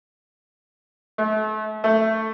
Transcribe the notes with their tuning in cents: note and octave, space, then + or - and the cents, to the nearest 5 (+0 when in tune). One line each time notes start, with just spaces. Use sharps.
A3 -40
A3 +5